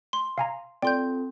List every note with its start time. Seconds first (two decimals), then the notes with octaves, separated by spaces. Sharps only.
0.13 C6
0.38 F5 G#5 A#5
0.82 C4 F4 A4 D5 G5 C6 G6